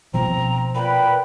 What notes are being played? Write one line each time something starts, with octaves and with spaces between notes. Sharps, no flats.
B2 F3 C4 A#5
A#2 B4 G5 B5